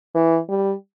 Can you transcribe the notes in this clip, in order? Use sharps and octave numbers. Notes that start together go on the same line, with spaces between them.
E3
G3